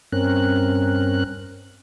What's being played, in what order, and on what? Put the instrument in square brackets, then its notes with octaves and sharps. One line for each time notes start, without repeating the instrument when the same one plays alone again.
[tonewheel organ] G2 C4 C#4 A#4 F#6